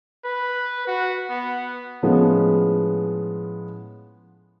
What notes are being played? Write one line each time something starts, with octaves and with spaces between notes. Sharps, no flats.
B4
F#4
B3
A2 F3 G#3 B3 C#4 F4